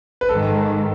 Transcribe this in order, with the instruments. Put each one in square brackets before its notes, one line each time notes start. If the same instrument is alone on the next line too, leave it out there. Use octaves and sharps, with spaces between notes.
[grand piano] B4
[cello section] G#2 D#3 G#3 [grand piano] A4